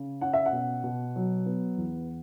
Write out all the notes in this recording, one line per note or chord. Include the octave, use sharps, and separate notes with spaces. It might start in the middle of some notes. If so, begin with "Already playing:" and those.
Already playing: C#3
C#4 F#5
E5
F#5
B2
B2
F#3
B3
E2